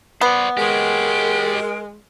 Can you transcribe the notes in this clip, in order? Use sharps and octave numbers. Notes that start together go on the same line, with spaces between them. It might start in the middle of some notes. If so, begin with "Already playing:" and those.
B3 C5 D5
G#3 G4 A#4 C#5